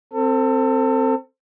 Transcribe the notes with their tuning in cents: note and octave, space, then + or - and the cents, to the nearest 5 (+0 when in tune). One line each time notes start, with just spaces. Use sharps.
C4 +0 A4 +30